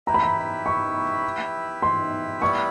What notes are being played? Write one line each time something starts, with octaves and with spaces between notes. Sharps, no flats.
E4 G4 B4 E5 A#5
B5
A#5
C#6
C6
G3 B3 E4 C#6